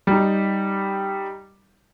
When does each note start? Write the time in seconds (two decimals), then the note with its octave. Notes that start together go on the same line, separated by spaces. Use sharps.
0.07 G3 D#4